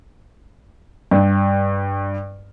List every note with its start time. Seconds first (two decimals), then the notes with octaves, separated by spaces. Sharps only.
1.11 G2